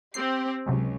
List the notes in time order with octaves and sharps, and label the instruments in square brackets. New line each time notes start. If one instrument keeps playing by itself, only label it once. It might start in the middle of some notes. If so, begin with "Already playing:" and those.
[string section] C4 G4 [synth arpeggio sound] C7
[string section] C#2 [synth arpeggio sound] C3 F#3 G#3